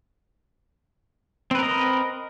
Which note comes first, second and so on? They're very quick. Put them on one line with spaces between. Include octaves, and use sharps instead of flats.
C4 B4 A#4 D#5